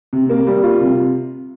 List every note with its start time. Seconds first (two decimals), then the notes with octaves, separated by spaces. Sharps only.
0.13 C3
0.30 A#3
0.47 G3
0.63 F4
0.81 C3